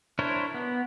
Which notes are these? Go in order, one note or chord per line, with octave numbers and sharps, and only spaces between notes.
D4 E4 A#4 C5 C#5
B3